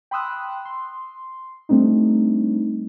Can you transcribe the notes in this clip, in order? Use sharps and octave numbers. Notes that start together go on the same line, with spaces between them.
G5 B5 C6 D#6 E6 F#6
C6
G3 A3 C4 D4 D#4